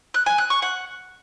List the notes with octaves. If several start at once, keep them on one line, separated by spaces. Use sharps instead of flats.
F#6
G#5
F#6
C#6
F#5